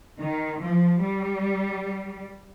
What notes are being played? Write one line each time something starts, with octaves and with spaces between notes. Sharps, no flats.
D#3
F3
G3